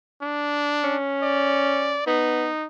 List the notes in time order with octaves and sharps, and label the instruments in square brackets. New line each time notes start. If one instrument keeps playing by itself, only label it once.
[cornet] D4
[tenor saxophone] C#4
[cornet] D5
[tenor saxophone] B3 [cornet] D#4